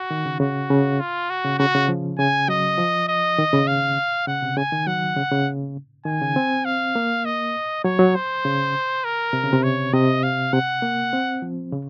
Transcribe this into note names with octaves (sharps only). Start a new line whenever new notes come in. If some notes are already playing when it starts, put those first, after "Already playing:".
Already playing: F#4
D#3
C#3
C#3 F#4
C#3
F4
F#4
C#3
C#3 F#4
C#3
F3
C#3 G#5
F#3 D#5
F3
D#5
D#3
C#3
F5
C#3 F#5
C3
C#3 G#5
D#3
F#3 F#5
C#3
C#3
D#3 G#5
C#3
C4
F5
A#3
D#5
F#3 C#5
F#3
C5
C#3
A#4
C3
C#3
C3
C#5
C3 D#5
F5
C3 F#5
A#3
C4
F3
C#3